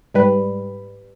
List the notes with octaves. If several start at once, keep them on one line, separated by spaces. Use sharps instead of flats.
G#2 G3 B4